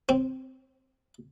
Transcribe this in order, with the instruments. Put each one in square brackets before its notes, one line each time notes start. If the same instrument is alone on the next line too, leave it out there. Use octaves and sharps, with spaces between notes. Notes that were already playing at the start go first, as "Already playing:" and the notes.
[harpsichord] C4